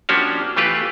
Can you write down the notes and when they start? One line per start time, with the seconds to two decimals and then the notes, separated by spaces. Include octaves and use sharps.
0.09 F3 A#3 C#4 D4 F#4 G4
0.57 E3 A3 F4 G4 B4